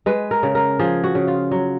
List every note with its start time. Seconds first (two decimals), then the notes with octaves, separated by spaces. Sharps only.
0.06 G#3 B4
0.31 A#4
0.43 C#3
0.55 A#4
0.79 F3 G#4
1.04 F#4
1.15 C#3
1.28 F4
1.51 F#3